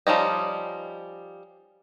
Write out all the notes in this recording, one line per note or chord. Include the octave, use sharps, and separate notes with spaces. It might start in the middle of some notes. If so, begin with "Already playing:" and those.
F3 G3 C#4 D#4